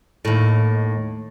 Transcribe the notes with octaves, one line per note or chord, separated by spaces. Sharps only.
D#2 A2